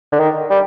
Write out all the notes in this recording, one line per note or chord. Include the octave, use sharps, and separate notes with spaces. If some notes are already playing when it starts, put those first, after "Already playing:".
D3
D#3
G3